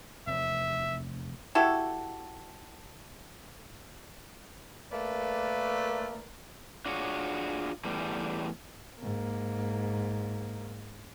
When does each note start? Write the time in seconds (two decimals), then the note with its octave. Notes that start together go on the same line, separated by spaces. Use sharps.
0.27 F1 E2 E5
1.55 E4 F#4 G4 A4
4.91 A3 A#3 A#4 B4 D5
6.86 D4 F4 F#4 G#4 C#5
7.84 E2 A2 G3
9.01 G#2 A#3